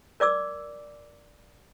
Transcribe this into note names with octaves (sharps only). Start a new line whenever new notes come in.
A#4 D5 D6 E6